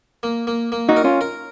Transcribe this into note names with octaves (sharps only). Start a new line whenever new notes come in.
A#3
A#3
A#3
D#4 F#4
A#4
C#4 F4
A#4